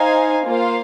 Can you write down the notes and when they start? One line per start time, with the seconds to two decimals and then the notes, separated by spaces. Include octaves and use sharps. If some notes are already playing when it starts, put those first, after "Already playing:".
Already playing: D#4 C5 F5 G#5
0.45 A#3 F4 C5 F5